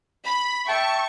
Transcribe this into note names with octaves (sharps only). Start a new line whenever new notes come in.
B5
E5 G5 A5 C#6